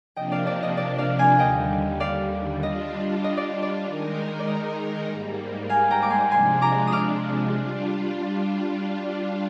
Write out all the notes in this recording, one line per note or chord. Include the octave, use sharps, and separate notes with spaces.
C3 F3 A#3 D4 D#5 G5
D5 F5
D5
D#5
D5
D5 F5
F5 G#5
D#2 D3 G3 D#5 G5
D5 F5
G3 D4 F4 D#5
D#5
D5
D5
D#3 G#3 D#4 A#4
D5
D#5
G#2 G3 A#3
F5 G#5
G5 A#5
D6
G#5 C6
C3 F3 G#3 D4 G#5 C6
A#5 D6
D#6
D6 F6
G3 D4 F4